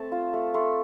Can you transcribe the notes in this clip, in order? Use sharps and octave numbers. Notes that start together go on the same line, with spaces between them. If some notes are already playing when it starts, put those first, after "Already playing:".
Already playing: A3 C4 A5
F4
A3
A3 C6